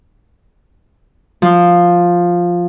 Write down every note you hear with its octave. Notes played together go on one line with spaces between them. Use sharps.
F3